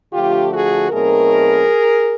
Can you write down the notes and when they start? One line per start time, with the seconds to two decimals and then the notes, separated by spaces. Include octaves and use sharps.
0.13 D3 F3 A3 F4 G4
0.51 F#4 G#4
0.90 B2 F#3 A3 C4 D#4 G#4 A#4